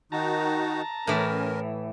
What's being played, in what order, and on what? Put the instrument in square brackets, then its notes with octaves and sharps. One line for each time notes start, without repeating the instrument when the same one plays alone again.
[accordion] D#3 D#4 F#4 [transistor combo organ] A5 A#5
[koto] A2 E3 [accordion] C#4 A#4